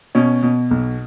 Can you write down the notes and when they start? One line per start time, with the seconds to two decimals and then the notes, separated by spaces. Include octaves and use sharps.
0.15 B2 C#4
0.43 B2
0.71 B1